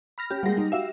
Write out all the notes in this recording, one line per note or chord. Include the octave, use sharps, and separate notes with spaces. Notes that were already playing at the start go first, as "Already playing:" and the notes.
B5 F6 A#6
C#4 G4
G3 G#3 A#3 F#5 A#6
D#4
F#4 G4 E5 F5